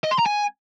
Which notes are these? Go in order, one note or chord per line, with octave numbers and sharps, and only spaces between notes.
D#5
C6
A#5
G#5